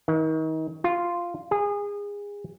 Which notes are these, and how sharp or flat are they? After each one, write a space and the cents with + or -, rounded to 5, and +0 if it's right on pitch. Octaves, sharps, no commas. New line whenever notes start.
D#3 +35
F4 -5
G#4 -25